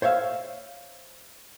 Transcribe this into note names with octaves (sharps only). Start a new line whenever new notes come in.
C5 C#5 E5 F5